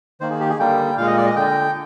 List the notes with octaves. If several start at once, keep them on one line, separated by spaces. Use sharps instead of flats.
D#3 A#3 C5
G#4
G4
G#4
D3 G3 A#3 G5
A#2 G#3 F5
D#5
D5
D#5
D3 G5